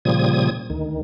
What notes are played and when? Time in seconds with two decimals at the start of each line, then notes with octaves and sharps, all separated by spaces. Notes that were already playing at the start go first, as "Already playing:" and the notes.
0.05 A#2 C#3 F3 G3 D#6 G#6
0.70 D2 D#3